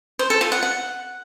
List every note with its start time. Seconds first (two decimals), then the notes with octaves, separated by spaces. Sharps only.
0.19 C5
0.30 A4
0.41 F4
0.52 F#5
0.63 F#5